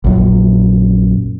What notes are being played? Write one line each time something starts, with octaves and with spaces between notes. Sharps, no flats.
A#1 F#2 A#2